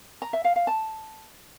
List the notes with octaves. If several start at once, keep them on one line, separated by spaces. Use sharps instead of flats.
A#5
E5
F5
F5
A5